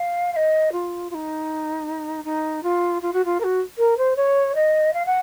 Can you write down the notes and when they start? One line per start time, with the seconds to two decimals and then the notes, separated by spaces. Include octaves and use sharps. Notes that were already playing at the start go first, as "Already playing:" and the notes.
Already playing: F5
0.33 F5
0.36 D#5
0.72 F4
1.10 F4
1.14 D#4
2.24 D#4
2.63 F4
3.02 F4
3.13 F#4
3.25 F4
3.40 A#4
3.44 F#4
3.78 A#4
3.97 C5
4.16 C#5
4.55 D#5
4.93 F5
5.06 F#5